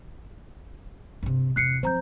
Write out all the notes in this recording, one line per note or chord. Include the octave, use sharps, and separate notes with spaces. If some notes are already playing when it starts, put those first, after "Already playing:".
G2 C3
E2 C3 F#6 C7 C#7
F3 C4 C5 A#5 G6